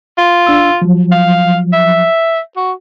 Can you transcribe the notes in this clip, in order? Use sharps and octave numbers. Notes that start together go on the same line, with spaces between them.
F4
D4 E6
F3 F#3
F5
E5
F#4